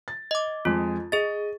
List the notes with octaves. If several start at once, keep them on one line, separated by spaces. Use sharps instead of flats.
A6
D#5 D6
F2 G#3 F4
G#4 D#5 A6